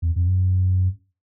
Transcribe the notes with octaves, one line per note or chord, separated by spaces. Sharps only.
E2
F2
F#2